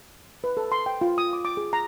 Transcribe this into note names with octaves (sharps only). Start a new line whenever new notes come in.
B4
A4
C6
G5
F4
D#6
D6
D6
G#4
A#5